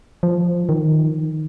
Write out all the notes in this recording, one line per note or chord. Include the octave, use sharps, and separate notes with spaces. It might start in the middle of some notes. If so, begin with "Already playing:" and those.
F3
D#3